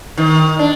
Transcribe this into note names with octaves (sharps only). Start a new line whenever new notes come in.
D#3
D4